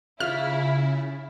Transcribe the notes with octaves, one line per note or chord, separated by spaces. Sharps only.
C#3 E4 F4 F6